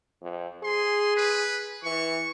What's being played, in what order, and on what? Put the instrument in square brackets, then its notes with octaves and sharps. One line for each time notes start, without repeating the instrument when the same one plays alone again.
[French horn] F2
[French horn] G#4 [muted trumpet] C6
[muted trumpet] B4
[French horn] E3 [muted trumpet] C#6